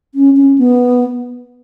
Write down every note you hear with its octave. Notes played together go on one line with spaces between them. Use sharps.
C#4
C#4
B3